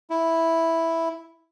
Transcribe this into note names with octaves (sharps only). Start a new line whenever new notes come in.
E4